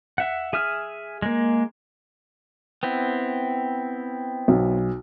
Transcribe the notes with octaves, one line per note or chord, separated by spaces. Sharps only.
E5 F#5
G#4 E5 D#6 F6
G#3 A#3
B3 C4 E4
B1